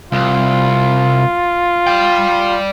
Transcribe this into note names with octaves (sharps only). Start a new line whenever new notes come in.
C2 F4
D5 G5